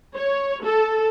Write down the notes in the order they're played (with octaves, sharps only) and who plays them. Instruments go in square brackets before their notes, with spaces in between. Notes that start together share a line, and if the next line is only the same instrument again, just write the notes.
[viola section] C#5
A4